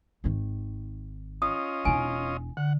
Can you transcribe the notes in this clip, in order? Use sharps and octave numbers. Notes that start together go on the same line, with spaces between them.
G#1 D#3
C#4 F4 D#5 D#6
E1 D#4 G#5
D3 F#5